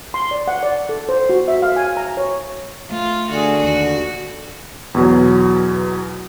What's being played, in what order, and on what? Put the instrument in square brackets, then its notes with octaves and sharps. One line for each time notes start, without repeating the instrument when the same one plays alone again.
[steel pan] C6
D5
F#5
D5
A4
C5
F#4
E5
F5
G#5
A#5
C#5
[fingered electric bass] A3 [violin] F4
[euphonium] D3 [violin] F#4 G#4
[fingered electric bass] D#2 [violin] F#4
[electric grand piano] E2 B2 F#3